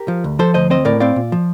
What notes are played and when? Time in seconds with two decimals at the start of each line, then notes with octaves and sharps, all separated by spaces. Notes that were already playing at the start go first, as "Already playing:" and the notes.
Already playing: G4 A#4
0.08 F3
0.24 D2
0.39 F3 A4 C5
0.54 D2 C5 D#5
0.70 C4 C5 D#5
0.85 A2 A#4 D5
1.00 C4 D5 F5
1.16 A#2
1.32 F3